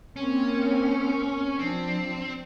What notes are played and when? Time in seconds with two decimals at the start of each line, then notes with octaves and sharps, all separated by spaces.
0.16 A#3 C4 C#4
1.59 F3 C4 D4